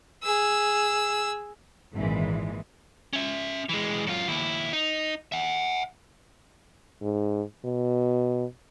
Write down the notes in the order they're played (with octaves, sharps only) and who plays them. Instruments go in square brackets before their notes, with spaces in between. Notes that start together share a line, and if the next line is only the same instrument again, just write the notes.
[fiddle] G#4 E6
[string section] G#1 A#2 E3 G#3
[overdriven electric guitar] C#4 E5
E3 G#3
F#2 F4
D#2 E4
D#4
E5 F#5
[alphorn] G#2
B2